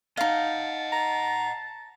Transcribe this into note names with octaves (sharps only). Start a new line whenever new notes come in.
D#4 D#5 F5 F#5 A5
A#5